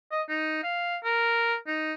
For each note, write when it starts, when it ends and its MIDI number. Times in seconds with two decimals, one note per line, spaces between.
0.12 0.22 75
0.29 0.61 63
0.64 0.97 77
1.04 1.56 70
1.67 1.93 63